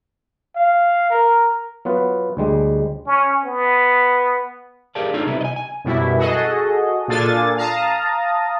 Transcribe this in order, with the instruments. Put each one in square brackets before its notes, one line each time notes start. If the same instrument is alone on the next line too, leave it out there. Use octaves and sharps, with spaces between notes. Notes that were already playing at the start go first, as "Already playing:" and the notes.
[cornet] F5
A#4
[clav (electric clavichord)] F#3 B3 F4 B4
D2 G3 G#3
[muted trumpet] C#4
B3
[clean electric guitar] G4 G#4 A#4 D5 F5 A5
D4 D#4 F4 G#4 A4 C#5
C3 G3 B3 D#4 E4
D#5 G#5
G#5
[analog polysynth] F#2 B2 G3 E4
F#4 G#4 A4 D#5
A#2 D4 F4 A4 G#5 A6
F5 A5 A#5 D#6